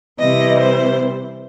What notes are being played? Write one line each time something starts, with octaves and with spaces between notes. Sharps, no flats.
C3 E3 G3 D#5
C5